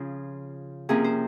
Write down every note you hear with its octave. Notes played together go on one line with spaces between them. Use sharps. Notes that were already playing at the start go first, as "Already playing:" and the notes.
Already playing: C#3 F3 F4
C3 F3 A#3 C#4 G#4
C5